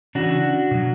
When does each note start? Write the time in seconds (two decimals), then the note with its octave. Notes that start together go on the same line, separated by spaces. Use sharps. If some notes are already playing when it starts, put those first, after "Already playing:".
0.15 C#3 E3 D4 F#4
0.71 B2 F#3